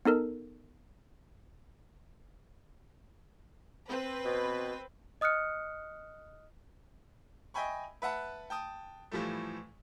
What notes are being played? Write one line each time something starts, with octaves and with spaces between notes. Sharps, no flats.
B3 D#4 A4 A#4
C4 B4
B2
D#5 D#6 F6 F#6 C#7
D#5 E5 G5 G#5 B5 C#6
B4 E5 F#5 A5 B5
G5 A5 D#6
A2 E3 F3 G3 A3